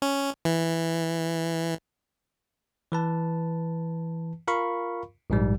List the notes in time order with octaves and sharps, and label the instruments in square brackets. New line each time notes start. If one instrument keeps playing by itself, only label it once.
[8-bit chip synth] C#4
E3
[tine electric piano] E3 B4 A5
F4 A#4 F5 B5 C#6
A#1 G#2 G3